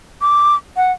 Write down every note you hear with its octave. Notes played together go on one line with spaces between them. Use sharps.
D6
F#5